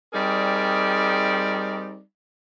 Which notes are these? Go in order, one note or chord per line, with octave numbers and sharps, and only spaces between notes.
G3 C4 D#4 G#4 A#4 D5